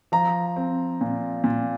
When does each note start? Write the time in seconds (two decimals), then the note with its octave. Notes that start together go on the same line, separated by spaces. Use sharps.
0.12 F3 A#5
0.56 C4
1.01 A#2
1.44 A#2